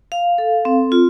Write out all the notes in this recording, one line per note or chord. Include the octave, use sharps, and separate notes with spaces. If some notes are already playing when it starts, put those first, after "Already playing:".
F5
A4
C4
F4